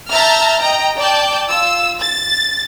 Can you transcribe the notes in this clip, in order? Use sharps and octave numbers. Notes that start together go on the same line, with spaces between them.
E5 A5 A#5 F6 G6 A6
D#5 G5 A#5
D5 G5 A5 G6
F4 E6
A6